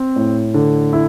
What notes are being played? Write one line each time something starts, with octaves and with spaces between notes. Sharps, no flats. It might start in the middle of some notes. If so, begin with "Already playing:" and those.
Already playing: C4
A2
D3
E4